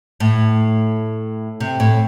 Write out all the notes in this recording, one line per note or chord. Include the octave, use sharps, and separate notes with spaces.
A2
C3
A2